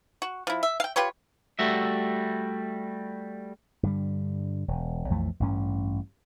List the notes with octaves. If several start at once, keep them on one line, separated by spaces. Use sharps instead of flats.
F#4
F3 E4
E5
F5 G5
F4 G4 B4 C#5
G3 A3 F#4 E5
G2 D3 G3
E1
B1 F2 E3 A3
A1 G2 C#4